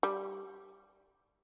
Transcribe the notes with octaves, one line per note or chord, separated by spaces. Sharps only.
G3